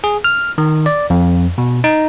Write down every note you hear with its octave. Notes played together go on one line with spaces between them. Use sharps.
G#4
F6
D#3
D5
F2
B2
D#4